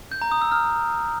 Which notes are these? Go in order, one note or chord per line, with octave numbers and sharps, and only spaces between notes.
G6
A#5
D#6
E6
F6